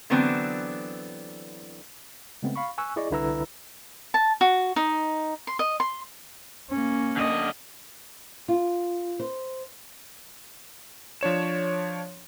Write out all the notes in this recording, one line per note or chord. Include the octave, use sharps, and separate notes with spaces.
D3 E3 F#3 B3 C4 D4
C#3 G#3 A3 B3 C4
F5 B5 C#6
G#5 C#6 E6 F#6
E4 G#4 D5 D#5 C#6
C2 D3 E4 B4 A#5 E6
A5
F#4
D#4
C6
D#5
C6
A#3 C#4
D3 D#5
F4
C5
F3 D4 C#5 E7